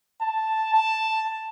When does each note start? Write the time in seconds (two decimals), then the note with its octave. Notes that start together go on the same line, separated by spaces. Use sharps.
0.22 A5
0.74 A5